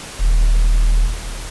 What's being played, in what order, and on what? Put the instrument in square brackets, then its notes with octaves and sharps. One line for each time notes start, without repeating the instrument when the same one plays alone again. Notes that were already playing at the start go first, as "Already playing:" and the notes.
[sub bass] D#1